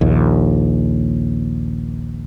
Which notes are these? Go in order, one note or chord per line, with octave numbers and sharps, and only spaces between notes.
A#1 D#2